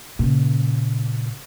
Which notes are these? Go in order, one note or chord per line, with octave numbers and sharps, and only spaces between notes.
A#2 C#3